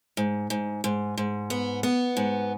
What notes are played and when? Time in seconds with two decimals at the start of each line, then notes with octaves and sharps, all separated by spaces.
0.17 G#2
0.50 G#2
0.84 G#2
1.18 G#2
1.50 B3
1.83 B3
2.17 G#2